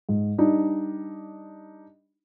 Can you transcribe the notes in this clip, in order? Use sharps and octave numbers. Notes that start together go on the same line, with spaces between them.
G#2
G3 D4 D#4